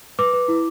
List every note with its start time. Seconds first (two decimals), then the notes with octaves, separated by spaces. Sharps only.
0.19 B4 D6
0.33 B4
0.48 E4